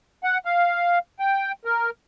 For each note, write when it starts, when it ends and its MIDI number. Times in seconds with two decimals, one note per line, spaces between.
0.24 0.38 78
0.45 0.99 77
1.19 1.52 79
1.65 1.90 70